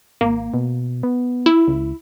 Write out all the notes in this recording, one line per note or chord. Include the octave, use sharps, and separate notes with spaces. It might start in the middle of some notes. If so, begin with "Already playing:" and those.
G#1 A#3
B2
B3
E4
C#2